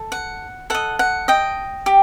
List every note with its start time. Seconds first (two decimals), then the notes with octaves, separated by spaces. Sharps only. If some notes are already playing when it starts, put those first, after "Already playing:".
Already playing: A4
0.12 F#5
0.70 A4 D#5 F#5
0.99 F#5
1.28 D#5 G5
1.86 G4